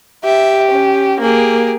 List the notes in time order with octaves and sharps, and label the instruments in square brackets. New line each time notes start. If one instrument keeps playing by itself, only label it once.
[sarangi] G4 [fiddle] E5
[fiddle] C#4
[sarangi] A#3 [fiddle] G4 G#4